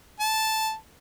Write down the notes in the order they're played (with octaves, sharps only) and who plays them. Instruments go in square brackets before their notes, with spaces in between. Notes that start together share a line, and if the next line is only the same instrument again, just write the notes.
[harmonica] A5